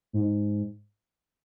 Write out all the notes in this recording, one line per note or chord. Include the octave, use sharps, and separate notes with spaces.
G#2